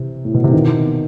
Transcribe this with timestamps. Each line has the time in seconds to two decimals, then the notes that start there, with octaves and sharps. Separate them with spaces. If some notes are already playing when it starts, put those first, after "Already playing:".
Already playing: C3 E3
0.25 A2
0.34 B2
0.44 C3
0.53 B2 D#3